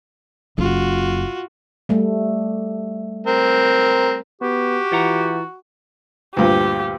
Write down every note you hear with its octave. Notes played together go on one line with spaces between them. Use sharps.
F#1 F4 F#4
G3 A3
C4 A#4
B3 F#4 G4
E3 F4 F#5 A#5
D2 G2 A#2 G4